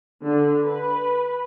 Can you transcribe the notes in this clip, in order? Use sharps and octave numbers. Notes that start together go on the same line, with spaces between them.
D3
B4